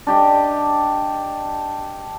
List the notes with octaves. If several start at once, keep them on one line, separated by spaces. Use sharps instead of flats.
D4 G4 D#5